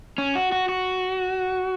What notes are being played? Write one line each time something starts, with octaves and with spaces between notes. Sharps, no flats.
C#4
F#4
F#4
F#4